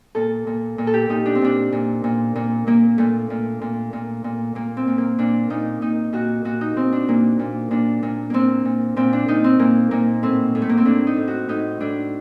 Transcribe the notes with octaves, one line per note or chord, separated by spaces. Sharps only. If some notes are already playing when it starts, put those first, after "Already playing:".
A#2 A4
A#2
A#2
A4
G4
A#2 D#4
D4
C4
A#2 D4
A#2
A#2
A#2
A#2 A#3
A#2 A3
A#2
A#2
A#2
A#2
A#2 A#3
C4
A#2
A#3
A#2 D4
A#2 D#4
A#2 D#4
A#2 F#4
A#2 F#4
D#4
A#2 C4
D4
A#2 A#3
A#2
A#2 D4
A#2
A#2 A#3 C4
A#2
A#2 C4
D4
A#2 D#4
C4
A#2 A#3
A#2 A#3
A2 C4
A2
A3
A#3
C4
A2 D4
D#4
A2
F#4
A2 D#4
A2 D4